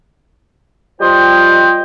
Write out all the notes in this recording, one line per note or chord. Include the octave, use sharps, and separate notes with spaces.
G3 F4 C5 D#5 G5